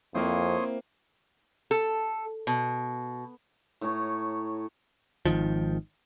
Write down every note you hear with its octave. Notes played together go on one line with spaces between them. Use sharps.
F2 A#3 C4 E4 C#5 C6 D#6
A4
B2
A2 C#5 A#5
G#1 D#2 D#3 F3